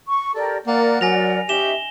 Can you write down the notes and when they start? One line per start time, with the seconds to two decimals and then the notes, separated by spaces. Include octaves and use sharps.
0.09 C#6
0.35 G4 A4 A#4 D5
0.67 A#3 A#4 D5 F#5
1.01 F#3 G#5 A#6 F7
1.49 C#4 D#4 G4 E5 E7 G7